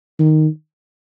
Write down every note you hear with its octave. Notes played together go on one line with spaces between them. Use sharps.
D#3